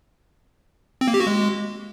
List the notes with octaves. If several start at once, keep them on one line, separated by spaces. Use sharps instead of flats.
C4
A#3
G4
F#4
G#3